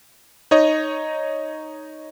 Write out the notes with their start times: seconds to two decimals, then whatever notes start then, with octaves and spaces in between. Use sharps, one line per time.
0.51 D#4 C#5 D#5